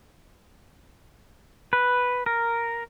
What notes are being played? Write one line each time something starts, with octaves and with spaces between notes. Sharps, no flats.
B4
A#4